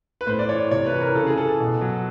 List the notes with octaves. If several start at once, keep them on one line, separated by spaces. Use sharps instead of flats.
B4
A2 C5
D5
E3 C#5
C3 C#5
B4
E3
A#4
C#3 A4
G#4
E3 A4
B2
F#3